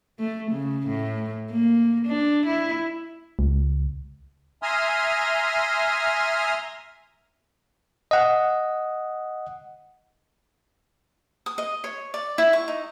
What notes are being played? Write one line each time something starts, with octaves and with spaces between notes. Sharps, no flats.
A3
C#3
A2
A#3
D4
E4
C#2
E5 G#5 A#5 C6 D#6 F6
D#5 F#5
D#6
D#5
C#5
D5
E4
C#6
D#4